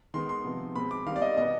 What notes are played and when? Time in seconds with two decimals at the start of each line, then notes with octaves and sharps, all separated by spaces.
0.14 D#3 G#3 B3 C6
0.29 C6
0.44 C3 F3 B3
0.75 B2 G#3 C4 B5
0.91 D6
1.06 D#3 G3 C4 F5
1.16 D5
1.22 D#5
1.37 B2 B3 D#5